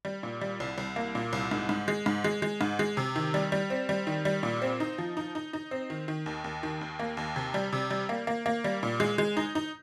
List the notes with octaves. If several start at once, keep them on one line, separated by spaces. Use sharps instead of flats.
G3
A#2
G3
C2
C2
A#3
A#2
C2
G#2
G#2
G#3
G#2
G#3
G#3
G#2
G#3
C3
D#3
G3
G3
C4
G3
D#3
G3
A#2
C4
D#4
F3
D#4
D#4
D#4
C4
D#3
D#3
D#2
D#2
D#3
D#2
A#3
D#2
C3
G3
C3
G3
A#3
A#3
A#3
G3
A#2
G#3
G#3
D#4
D#4